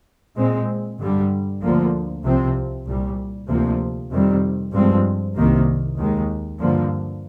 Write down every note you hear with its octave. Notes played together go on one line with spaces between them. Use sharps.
A#2 G#3 C4
G2 D3 G3
D2 D3 F3 A#3
C2 C3 F3 C4
C2 A#2 G3
D2 C3 F3 A#3
F2 C3 D#3 G3 C4
G2 F3 G#3 C4
C2 C3 D#3 A#3
D#2 D#3 G#3
G2 D3 F3 A#3